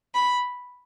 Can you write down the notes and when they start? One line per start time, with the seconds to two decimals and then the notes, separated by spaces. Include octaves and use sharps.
0.14 B5